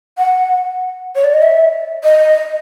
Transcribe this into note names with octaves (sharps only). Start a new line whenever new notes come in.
F#5
C#5
D5
D#5
E5
D#5